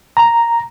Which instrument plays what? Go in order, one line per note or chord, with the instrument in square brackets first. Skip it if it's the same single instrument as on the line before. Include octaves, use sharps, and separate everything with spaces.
[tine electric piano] A#5